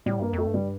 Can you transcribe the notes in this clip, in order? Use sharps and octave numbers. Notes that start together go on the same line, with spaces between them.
A2 G3
G2 A#3
F2
A3
G2
G3